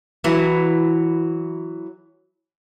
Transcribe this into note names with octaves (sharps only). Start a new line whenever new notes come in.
E3 F#3